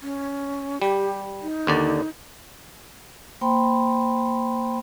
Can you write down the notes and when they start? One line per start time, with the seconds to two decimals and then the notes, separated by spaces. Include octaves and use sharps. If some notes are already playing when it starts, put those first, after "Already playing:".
0.01 C#4
0.82 G3 G4
1.42 D#4
1.67 D#2 D3 D5
3.41 A#3 C5 G5 B5 C6